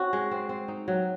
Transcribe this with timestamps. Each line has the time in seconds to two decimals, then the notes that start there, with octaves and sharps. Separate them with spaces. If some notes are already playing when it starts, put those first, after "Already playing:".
Already playing: C4 C#4 F#4
0.13 G#3
0.31 C4
0.49 C4
0.68 D#4
0.88 F#3